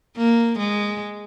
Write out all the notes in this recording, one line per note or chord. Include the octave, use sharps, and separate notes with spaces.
A#3
G#3